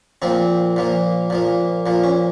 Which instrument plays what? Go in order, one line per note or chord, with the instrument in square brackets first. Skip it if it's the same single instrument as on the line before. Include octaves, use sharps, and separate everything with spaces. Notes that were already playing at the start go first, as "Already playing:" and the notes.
[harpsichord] A#2 F3 A#3 C4
A#2 F3 A#3
A#2 F3 A#3
A#2 F3 A#3
C#4